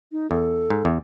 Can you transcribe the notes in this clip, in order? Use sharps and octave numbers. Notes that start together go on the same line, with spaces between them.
D#4
E2 A4
G#2
E2